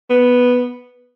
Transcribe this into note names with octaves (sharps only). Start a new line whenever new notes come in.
B3